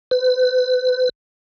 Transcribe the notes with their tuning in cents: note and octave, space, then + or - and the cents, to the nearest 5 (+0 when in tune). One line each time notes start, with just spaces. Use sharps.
B4 +40